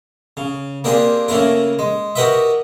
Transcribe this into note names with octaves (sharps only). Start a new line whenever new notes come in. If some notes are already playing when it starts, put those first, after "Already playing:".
C#3
A#3 C4 D4 G4 G#4
C#3 A3 A#3 E4 A#4
G#3
F#4 G4 A#4 B4 D#5 E5